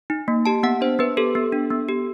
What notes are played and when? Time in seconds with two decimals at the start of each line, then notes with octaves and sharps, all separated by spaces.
0.10 D#4
0.28 A#3
0.46 G4 A5
0.63 B3 F#5
0.81 D4 C5
0.99 B3 B4
1.17 G4 A4
1.35 B3
1.53 D4
1.70 B3
1.89 G4